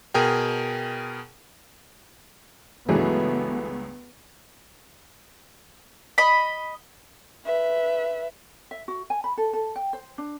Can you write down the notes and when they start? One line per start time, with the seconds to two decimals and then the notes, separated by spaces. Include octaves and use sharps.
0.14 B2 G#4 A#4 G5
2.89 C#2 G2 E3 F#3 A3 B3 G#4
6.18 D#5 B5
7.45 B4 E5
8.71 E5
8.88 F#4
9.10 G#5
9.24 B5
9.37 A4
9.53 A4
9.76 G5
9.93 C5
10.18 D4